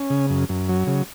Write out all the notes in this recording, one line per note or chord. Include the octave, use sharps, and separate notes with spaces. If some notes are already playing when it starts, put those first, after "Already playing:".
Already playing: C#4
C#3
F#2
F#2
F#3
C#3